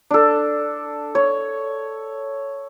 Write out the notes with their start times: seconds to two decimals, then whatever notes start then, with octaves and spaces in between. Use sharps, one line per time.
0.11 D4 A4
1.15 C#5